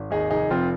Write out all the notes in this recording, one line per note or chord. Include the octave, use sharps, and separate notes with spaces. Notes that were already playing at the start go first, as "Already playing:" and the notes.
Already playing: G#1
D#2 D#4 G#4
F1 D#4 G#4
F1 C4 F4